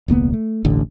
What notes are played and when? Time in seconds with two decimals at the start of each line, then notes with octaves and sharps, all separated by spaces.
0.08 E1 C#2 A#3 B3
0.34 A3
0.64 E1 A1 D3